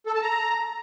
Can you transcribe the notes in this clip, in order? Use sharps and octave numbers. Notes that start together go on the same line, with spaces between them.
A4
A5
A#5